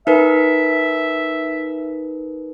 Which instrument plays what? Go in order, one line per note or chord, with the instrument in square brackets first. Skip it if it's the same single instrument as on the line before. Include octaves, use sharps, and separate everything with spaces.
[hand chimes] D#4 A#4 B4 [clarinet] E5